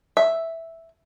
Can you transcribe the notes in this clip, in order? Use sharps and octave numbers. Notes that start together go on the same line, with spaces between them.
E5